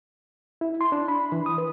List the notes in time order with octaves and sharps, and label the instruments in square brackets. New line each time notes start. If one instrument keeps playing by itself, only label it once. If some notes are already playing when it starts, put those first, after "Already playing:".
[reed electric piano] E4
C6
D4
B5
E3
D#6
B4